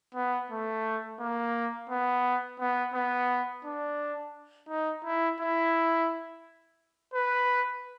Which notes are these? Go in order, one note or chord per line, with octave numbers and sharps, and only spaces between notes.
B3
A3
A#3
B3
B3
B3
D4
D#4
E4
E4
B4